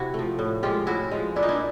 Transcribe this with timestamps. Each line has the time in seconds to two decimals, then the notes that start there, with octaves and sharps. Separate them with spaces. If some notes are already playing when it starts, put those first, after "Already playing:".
Already playing: C3 E4 F#4
0.14 F3 A3
0.39 A2
0.63 F3 G#3 F4 G4
0.87 A2 E4 F#4
1.11 F3 G#3
1.36 A#2 D4 E4
1.43 D#4
1.48 D4 E4